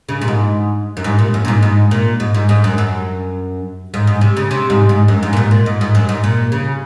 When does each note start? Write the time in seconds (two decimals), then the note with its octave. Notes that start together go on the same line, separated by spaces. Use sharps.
0.09 C#3
0.22 A#2
0.28 G#2
0.97 F#2
1.04 G#2
1.19 A#2
1.34 F#2
1.45 A#2
1.48 G#2
1.63 G#2
1.91 A#2
2.20 G#2
2.34 G#2
2.49 G#2
2.64 F#2
2.78 F#2
3.94 G#2
4.07 G#2
4.21 C3
4.37 C#3
4.51 C3
4.70 G#2
4.89 G#2
5.08 F#2
5.23 G#2
5.33 A#2
5.37 G#2
5.51 A#2
5.66 G#2
5.81 G#2
5.95 F#2
6.09 G#2
6.24 A#2
6.52 C#3